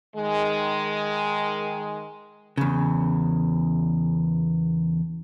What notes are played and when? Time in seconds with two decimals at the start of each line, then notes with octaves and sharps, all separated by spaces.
0.16 D#3 G#3
2.58 E2 C#3